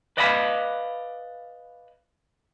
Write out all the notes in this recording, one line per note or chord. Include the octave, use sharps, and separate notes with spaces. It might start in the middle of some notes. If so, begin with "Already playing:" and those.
B4 D5 D#5 F5 G#5 B5